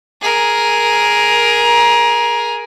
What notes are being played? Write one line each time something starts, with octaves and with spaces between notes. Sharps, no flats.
G#4 A#4